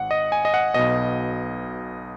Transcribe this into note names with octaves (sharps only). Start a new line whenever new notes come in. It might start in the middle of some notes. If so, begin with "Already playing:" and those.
Already playing: G#1 F#5
D#5
G#5
D#5
F#5
B1 B2 D#5